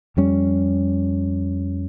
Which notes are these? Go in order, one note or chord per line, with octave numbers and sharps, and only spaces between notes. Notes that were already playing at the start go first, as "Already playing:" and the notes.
F2 G3 C#4